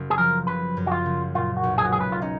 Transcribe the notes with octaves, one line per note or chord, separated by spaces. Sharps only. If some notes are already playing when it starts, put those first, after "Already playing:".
Already playing: F#1
G#4
F3 A#4
F#1 B4
F#2
F#4
F4
F#1
A#2 F4
F#4
B1
G#4
F#4
G#3 G#4
B4
F4
C#4 D#4